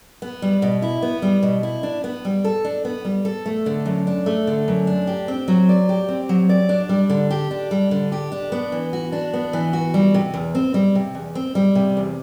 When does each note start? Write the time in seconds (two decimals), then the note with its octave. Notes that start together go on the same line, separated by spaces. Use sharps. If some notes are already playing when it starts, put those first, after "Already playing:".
0.22 B3
0.42 G3
0.62 B2
0.82 E4
1.02 B3
1.22 G3
1.43 B2
1.63 E4
1.83 D4
2.04 B3
2.25 G3
2.44 A4
2.64 D4
2.85 B3
3.05 G3
3.25 A4
3.46 A3
3.66 D3
3.86 F#2
4.07 D4
4.26 A3
4.47 D3
4.68 F#2
4.87 D4
5.07 G4
5.28 C4
5.48 F#3
5.69 D5
5.89 G4
6.09 C4
6.29 F#3
6.49 D5
6.69 D4
6.89 G3
7.10 D3
7.30 G4
7.51 D4
7.71 G3
7.91 D3
8.12 G4
8.32 D4
8.52 B3
8.72 E3
8.93 F#4
9.12 D4
9.34 B3
9.53 E3
9.73 F#4
9.94 G3
10.14 C3
10.34 E2
10.55 C4
10.74 G3
10.95 C3
11.15 E2
11.35 C4
11.55 G3
11.75 C3
11.97 E2